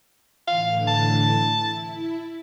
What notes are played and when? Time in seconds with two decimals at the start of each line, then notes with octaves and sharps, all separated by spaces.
0.47 A2 D3 E3 F5
0.88 A5
1.54 E4